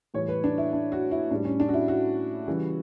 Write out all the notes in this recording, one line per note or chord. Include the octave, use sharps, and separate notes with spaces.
A2 E3 G3 C#5
B4
D4
E4
D4
F#4
E4
A2 G3 D4
C#4
D4
F#4
E4
F#4
C#3 E3 G3